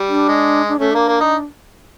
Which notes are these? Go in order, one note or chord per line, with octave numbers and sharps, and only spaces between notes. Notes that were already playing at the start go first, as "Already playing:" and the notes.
Already playing: G3
D4
G#3
D4
A3 C#4
A#3 D4
A#3
D#4